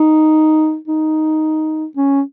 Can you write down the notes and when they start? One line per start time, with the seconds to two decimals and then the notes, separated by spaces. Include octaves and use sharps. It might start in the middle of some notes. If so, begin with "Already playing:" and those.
Already playing: D#4
0.87 D#4
1.97 C#4